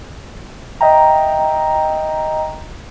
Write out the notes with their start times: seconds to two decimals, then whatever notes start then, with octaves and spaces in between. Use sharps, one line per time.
0.81 D#5 E5 G5 A#5